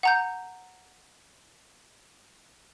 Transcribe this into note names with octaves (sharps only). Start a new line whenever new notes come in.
F#5 A#5 G6